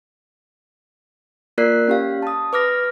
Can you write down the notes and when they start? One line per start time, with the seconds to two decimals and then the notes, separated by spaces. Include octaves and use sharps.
1.58 A#3 F4 A#4 D5 F#6 C7
1.88 C#4 G4 F5
2.22 A5 D#6
2.53 B4 D6 F6 A#6